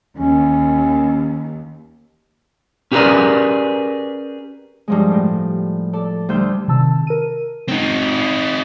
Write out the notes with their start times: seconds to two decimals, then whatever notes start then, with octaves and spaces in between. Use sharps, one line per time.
0.17 D#2 C#4
2.92 C#4 G4 G#4 A#4 B4 D5
4.88 G2 F3 G#3
5.11 A2 G5
5.93 A4 D5
6.29 D2 G3 F4 C5 E5 G6
6.68 C3 D#3 A5 E6
7.07 A#4 D#7
7.69 C4 D#4